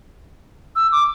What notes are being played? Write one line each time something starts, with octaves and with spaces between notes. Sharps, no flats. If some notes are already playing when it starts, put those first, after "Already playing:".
E6
D6